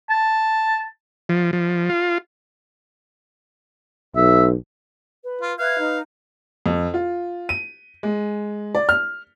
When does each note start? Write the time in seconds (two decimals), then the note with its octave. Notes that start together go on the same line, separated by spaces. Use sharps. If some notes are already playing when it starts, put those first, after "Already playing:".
0.10 A5
1.29 F3
1.53 F3
1.89 F4
4.16 B1 E5
5.23 B4
5.41 F4
5.59 B4 E5 F5 F#6 G#6
5.79 D#4
6.66 F2
6.94 F4
7.49 D#7
8.03 G#3
8.75 D5
8.89 F6